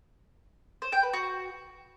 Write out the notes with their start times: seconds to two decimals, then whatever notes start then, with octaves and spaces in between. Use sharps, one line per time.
0.82 C5
0.92 G5
1.03 B4
1.13 F#4